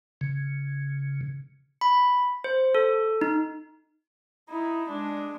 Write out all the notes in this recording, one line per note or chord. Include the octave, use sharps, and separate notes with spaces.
C#3
B5
C5
A4
D#4
D#4 E4
G#3 D4